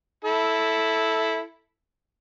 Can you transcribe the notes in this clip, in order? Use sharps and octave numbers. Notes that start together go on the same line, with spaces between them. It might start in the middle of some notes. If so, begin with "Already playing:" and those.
E4 A4